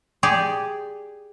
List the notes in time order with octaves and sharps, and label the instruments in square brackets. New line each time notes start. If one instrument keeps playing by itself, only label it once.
[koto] G4 G#4 D5